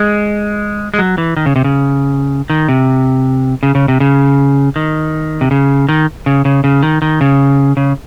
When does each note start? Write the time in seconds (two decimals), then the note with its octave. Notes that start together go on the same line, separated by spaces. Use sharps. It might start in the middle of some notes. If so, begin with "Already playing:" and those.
Already playing: G#3
0.94 G#3
0.99 F#3
1.18 E3
1.37 D#3
1.46 C#3
1.56 C3
1.64 C#3
2.50 D#3
2.69 C3
3.63 C#3
3.75 C#3
3.88 C3
4.00 C#3
4.76 D#3
5.41 C3
5.51 C#3
5.89 D#3
6.26 C#3
6.45 C#3
6.64 C#3
6.83 D#3
7.02 D#3
7.21 C#3
7.77 C#3